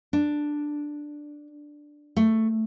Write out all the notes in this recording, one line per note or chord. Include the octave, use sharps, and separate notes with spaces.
D4
A3